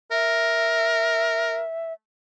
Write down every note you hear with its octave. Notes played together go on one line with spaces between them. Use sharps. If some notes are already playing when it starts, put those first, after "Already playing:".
A#4 E5